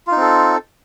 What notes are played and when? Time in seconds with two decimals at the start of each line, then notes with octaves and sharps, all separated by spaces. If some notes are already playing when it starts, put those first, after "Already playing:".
0.07 F4
0.12 D#4
0.17 C4
0.21 A4